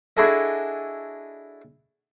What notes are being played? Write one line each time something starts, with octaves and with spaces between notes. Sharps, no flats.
D4 E4 F#4 G#4 A4 D#5